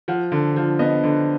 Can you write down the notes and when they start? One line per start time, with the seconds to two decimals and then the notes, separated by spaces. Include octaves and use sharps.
0.08 F3 F#5
0.32 D3
0.56 F3
0.79 B3 D#5
1.03 D3